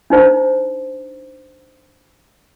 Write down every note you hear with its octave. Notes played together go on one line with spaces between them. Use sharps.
D4 D#4 C5 A#5